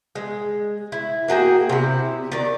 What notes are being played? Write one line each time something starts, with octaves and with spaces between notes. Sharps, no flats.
G#3
E4
A#3 F#4 G#4 G5
C3 E4
D#3 D5